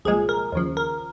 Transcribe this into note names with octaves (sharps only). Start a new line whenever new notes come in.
C2 A#2 F3 G#3 G#4
A#4
D#2 C#3 F3
A#4